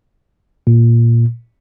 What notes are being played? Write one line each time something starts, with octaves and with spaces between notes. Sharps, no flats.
A#2